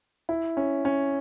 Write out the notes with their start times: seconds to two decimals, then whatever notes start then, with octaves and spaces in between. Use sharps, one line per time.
0.29 E4
0.57 C#4
0.85 C#4